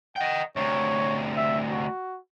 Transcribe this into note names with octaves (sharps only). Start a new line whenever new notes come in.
D#5 F#5 G5
D2 C3 C#5
E5
F#4